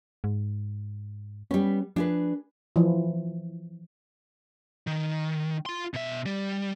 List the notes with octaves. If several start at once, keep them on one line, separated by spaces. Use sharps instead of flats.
G#2
G3 B3 C#4
F3 D4 G#4 B4
E3 F3
D#3
F4 C6
B2 E5
G3